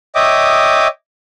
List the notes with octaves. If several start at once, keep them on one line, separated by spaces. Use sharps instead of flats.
C#5 D#5 E5 G5 D6 D#6